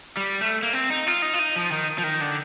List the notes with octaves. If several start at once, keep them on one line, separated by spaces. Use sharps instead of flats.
G3
A3
A#3
C4
D#4
F4
D#4
F4
D#4
F3
D#3
F3
D#3
D3